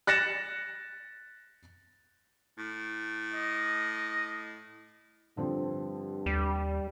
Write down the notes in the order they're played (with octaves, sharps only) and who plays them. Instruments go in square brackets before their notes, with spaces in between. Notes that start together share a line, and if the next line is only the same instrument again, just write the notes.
[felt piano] F#6 A6 A#6 C#7 E7
[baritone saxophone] A2
[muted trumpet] D#5
[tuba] G2 [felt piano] D3 F3 C4
[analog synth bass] D#2 [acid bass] G3